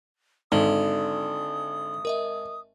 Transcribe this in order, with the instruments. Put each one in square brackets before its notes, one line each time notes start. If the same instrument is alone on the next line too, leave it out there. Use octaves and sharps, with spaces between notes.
[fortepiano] G#1 [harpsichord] D3 [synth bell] D#4 [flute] D#6
[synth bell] A#4 D#5 E5